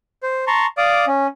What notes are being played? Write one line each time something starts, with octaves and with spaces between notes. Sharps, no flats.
C5
A5 A#5 C6 C#6
D5 F5 D6 D#6
C#4